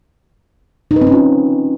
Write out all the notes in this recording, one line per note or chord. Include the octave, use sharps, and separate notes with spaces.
D#4
B4
C4
C#4
F4